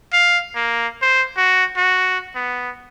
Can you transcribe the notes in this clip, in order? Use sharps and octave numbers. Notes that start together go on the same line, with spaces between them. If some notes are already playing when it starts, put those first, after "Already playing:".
F5
A#3
C5
F#4
F#4
B3